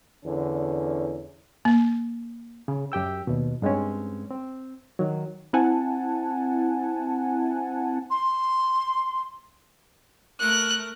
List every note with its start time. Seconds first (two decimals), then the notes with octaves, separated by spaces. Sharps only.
0.24 E2 D3 C#4
1.65 A#3
2.68 C#3
2.92 F#2 G4 G5 E6
3.27 D#2 B2
3.62 G2 G#3 C4 C#4
4.30 C4
4.99 D#3 F#3
5.53 C4 E4 F#5 G#5 A5
8.10 C6
10.40 A3 A#4 F#6